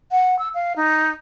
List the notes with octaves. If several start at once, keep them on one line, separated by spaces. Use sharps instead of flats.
F#5
E6
F5
D#4